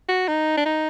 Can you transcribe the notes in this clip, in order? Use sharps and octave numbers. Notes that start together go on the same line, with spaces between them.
F#4
D#4
D4
D#4